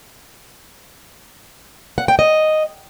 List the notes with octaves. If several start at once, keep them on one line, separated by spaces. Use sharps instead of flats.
F#5
G5
D#5